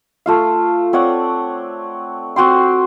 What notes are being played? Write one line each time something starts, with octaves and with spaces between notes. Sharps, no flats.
A3 F4 F5
C4 C#5 D5 F#5
C4 F#4 G5 C6